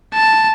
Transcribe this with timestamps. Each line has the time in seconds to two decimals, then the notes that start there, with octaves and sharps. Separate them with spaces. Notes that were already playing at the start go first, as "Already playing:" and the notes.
0.14 A5